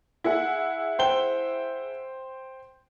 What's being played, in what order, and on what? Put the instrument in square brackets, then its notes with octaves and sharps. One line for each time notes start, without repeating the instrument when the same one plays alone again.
[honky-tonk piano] E4 G#4 F#5
[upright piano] C5 G5 G7